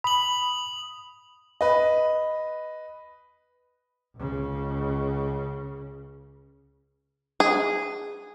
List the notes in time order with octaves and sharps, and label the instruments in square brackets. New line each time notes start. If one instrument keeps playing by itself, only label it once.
[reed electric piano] B5 [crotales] D#6 F#7
[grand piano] B4 D#5
[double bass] C#2 C#3
[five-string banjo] G#4